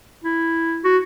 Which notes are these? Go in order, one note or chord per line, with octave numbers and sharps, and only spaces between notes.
E4
F#4